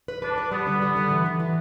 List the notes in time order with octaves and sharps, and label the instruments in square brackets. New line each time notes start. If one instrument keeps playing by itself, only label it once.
[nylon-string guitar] B4
[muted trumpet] D4 [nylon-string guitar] B4
[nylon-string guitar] B4
[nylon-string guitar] G3 [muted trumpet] B3
[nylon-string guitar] D3
G3
D3
E3
E3
E3